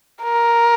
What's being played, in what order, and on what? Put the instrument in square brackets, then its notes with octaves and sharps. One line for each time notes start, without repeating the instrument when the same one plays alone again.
[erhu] A#4